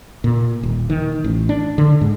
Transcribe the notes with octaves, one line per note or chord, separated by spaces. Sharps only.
A#2
D#1
D#3
A1
D4
D3
G#2